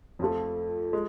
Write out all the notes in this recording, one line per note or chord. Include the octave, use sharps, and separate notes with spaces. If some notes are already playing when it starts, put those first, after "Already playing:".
F2 F3 A3
G#3